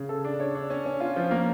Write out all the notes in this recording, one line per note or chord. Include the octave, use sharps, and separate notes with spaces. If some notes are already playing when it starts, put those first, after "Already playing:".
Already playing: C#3
A4
D4
C#5
D4
C#4
C#4
F4
F3
A#3